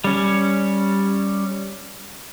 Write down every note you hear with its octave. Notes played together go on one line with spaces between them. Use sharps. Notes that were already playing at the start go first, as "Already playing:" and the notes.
G3 C#4